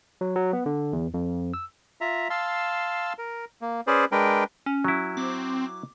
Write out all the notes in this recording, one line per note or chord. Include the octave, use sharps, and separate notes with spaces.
F#3
F#3
B3
D3
E2
F2
E6
F4 E5 A#5
F5 A5 C6 E6
A#4
A#3
C#4 G#4 B4 C5 D5
G#3 D4 A#4 B4 G5
C#4
F#3 E4
C4 D6